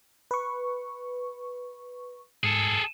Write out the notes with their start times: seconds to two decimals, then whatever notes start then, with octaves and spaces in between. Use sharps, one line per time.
0.31 B4 C#6
2.44 G#2 G#4 A4